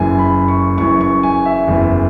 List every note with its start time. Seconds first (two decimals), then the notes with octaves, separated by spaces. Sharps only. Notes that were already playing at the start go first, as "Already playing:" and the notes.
Already playing: F#1 F#2 E3 G#5
0.19 B5
0.48 C#6
0.78 F#1 F#2 E3 C#6
1.01 C#6
1.23 G#5
1.46 E5
1.67 F#1 E2 E3